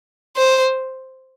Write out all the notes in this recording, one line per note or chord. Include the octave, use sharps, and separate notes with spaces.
C5